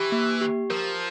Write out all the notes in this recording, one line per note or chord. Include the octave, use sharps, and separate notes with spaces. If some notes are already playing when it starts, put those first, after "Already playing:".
Already playing: E3 G4
A#3
G4
F3 A#4